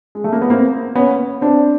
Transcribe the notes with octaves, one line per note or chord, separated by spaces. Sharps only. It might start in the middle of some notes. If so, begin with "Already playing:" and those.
G#3
A3
A#3
B3
A#3 C4
B3 C#4
C4 D4